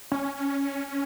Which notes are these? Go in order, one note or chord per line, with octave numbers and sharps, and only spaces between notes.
C#4